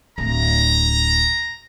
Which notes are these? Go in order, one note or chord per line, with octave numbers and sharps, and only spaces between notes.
D1 A#5